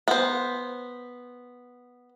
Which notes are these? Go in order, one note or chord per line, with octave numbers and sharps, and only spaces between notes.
B3 C5